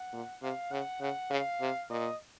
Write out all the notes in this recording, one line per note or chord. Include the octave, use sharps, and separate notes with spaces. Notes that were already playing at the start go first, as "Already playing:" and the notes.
Already playing: F#5
A#2
C3 F5
C#3 F#5
C#3 F#5
C#3 F5
C3
A#2 D#5